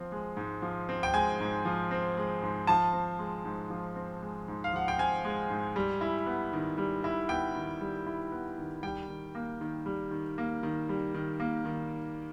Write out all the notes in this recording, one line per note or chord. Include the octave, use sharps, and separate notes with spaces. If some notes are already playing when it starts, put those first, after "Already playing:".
Already playing: F3 C4
G#3
G#2
F3
C4
G5
G#3 G#5
G#2
F3
C4
G#3
G#2
F3 A5
C4
G#3
G#2
F3
C4
G#3
G#2
F5
F3 F#5
G5
C4 G#5
G#3
G#2
G3
E4
B3
D#3
G3
E4
B3 G5
D#3
G3
E4
B3
D#3
G3 G5
D#3
A#3
D#3
G3
D#3
A#3
D#3
G3
D#3
A#3
D#3